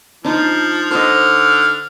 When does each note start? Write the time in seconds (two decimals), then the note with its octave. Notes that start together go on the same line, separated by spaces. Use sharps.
0.24 F3 D4 D#4
0.91 D3 C5 D#5 F6